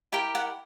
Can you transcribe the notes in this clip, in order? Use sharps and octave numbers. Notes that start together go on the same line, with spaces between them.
E4 G4 A#4 G5
F#5